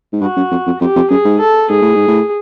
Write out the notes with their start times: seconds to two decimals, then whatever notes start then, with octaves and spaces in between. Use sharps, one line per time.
0.13 G#2
0.21 G2 F#4
0.37 F#2
0.51 F2
0.66 F2
0.81 F2 G4
0.96 F2
1.10 F#2 G#4
1.25 G#2
1.40 A4
1.69 G#2 G#4
1.82 A2
1.95 G#2
2.08 A2